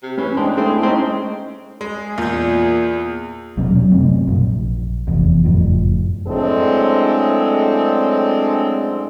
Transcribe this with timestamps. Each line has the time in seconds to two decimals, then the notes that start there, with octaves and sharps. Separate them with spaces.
0.03 C3
0.17 E3 C#4
0.37 G#3 C4 D4
0.57 A3 C4 E4 G#4
0.83 G#3 C4 C#4 D#4
1.81 G#3 G#4
2.18 E2 A#2 G6
3.57 D#1 B2 F#3 C#4
3.74 F#3
3.92 F#2 C3 A3 C4
4.27 A#1
5.07 F1 E2
5.44 F#1 F2 A2 F3
6.28 F#2 A2 G#3 C4 D4 A4